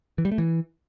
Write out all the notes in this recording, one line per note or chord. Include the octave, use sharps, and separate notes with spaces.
E3
G3
A3
E3